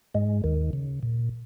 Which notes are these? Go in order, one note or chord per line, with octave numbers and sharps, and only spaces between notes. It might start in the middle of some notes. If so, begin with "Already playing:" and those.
G#2 G#3
D#2 D#3
C#3
A#2